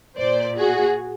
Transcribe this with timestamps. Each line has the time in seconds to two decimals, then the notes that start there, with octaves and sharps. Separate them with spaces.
0.17 A#2 C5 D5
0.57 F#4 G#4